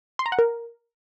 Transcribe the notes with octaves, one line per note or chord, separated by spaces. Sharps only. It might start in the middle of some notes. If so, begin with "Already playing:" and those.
C6
A#5
F#5
A#4